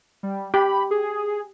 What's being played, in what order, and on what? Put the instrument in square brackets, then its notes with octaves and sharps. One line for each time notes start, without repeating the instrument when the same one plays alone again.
[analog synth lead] G3
[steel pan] G4 [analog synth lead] B5
[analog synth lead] G#4